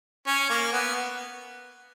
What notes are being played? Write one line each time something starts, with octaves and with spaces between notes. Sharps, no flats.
C#4
A#3
B3